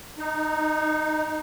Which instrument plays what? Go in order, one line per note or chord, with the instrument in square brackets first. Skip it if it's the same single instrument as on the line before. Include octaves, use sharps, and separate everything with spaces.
[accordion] D#4